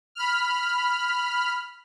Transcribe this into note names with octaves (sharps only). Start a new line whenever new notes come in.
B5 F6